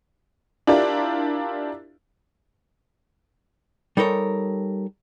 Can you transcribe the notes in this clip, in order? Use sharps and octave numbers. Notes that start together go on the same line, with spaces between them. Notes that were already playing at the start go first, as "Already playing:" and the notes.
D4 E4 F4 G4 A#4 D5
G3 D#4 A4 A#4 C#5